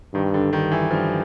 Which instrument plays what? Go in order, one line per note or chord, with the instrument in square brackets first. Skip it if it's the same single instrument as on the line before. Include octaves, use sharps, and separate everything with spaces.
[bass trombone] G2 [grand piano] D#3
[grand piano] D3
[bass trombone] G2 [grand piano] D#3
[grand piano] E3
[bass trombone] G2 [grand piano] F3